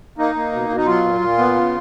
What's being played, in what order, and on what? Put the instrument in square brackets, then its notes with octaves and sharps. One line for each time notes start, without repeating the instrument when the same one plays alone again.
[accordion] A#3 D#4
A#3
B2
B2
D#4
F#3 F4
A#2
A#2
B3
C#3